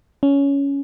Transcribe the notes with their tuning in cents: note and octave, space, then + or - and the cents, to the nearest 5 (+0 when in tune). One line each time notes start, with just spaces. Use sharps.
C#4 +10